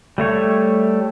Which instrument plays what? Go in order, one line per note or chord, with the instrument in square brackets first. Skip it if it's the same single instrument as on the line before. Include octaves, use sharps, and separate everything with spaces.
[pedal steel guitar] G3 A3 C#5